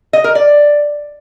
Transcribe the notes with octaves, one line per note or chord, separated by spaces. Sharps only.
D#5
A#4
D5